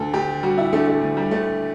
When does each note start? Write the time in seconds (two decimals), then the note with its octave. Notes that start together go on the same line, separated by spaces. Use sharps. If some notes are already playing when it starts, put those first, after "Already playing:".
Already playing: D2 D3 A4
0.14 D2 G4
0.43 G3 F#4
0.58 E4
0.72 D3 A3
0.87 A3
1.02 D2
1.17 G3
1.31 D2 A3